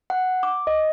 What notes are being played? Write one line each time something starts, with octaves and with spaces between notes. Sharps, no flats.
F#5
D6
D#5